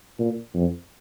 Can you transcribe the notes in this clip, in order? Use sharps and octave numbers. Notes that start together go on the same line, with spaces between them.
A#2
F2